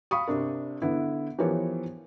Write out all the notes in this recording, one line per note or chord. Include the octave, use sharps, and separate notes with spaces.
F5 B5 C#6 D#6
C3 D4 A#4
D3 B3 E4
E3 F3 B3 G4 A#4 C#5